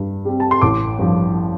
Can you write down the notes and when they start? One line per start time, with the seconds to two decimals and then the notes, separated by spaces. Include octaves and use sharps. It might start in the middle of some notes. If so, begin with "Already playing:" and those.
Already playing: G2
0.25 G3 C4
0.40 A5
0.51 C6
0.61 A1 D6
0.99 G2 F3